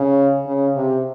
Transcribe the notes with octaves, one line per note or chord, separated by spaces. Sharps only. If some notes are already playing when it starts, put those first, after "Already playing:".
Already playing: C#3
C#3
C3